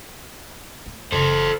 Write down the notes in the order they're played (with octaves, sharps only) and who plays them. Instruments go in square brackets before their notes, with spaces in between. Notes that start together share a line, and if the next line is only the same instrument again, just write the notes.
[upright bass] A3
[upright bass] F#1 C#3 [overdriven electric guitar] A4 C5